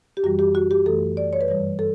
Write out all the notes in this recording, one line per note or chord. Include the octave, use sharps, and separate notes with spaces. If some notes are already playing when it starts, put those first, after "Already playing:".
G4
F#2 E3 G3 F#4
G4
F#4
G4
F#2 E3 A3 A4
D5
C#5
B4
G2 E3 G3 C#5
A4